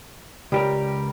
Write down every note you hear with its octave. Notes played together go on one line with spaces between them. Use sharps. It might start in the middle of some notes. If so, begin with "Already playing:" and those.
C#2 G3 G4 A#4